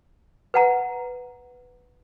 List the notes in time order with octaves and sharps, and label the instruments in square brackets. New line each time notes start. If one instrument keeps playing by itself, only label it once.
[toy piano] B4 F#5 A#5